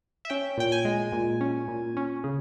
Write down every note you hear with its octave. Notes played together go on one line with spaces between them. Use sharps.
E5
C#4 G5
A#2 G5
G#5
G#3
A#2
C#4
A#2
C#4
C#3